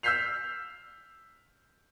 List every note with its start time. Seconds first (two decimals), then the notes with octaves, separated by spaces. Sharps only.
0.03 E6 F6 G6 B6 C7 F7